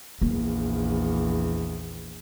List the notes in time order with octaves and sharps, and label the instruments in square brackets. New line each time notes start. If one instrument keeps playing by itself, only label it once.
[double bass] A#1 E2 [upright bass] A#3